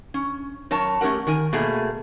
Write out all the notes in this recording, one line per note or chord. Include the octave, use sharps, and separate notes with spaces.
C#4
F#2 A#4 C#5 A5
A3 C#4 G4 A#4 F#5
D#3 A#4 G#5
B2 A3 A#3 G#4